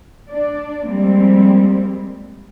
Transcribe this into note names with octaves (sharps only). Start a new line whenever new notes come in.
D4 D5
F3 G3 G#3 A#3 C4